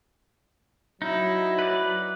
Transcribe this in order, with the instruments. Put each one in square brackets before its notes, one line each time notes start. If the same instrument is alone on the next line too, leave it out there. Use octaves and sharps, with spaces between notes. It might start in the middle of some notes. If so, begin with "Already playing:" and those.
[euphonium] F#3 [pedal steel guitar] D#4 [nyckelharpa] E4
[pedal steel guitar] B4 D5